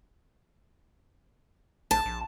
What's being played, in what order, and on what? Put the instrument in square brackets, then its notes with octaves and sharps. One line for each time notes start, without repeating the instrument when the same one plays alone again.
[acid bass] A#1 [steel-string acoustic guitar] A5
[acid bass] A#1